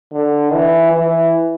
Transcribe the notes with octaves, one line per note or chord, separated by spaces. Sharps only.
D3
E3
E3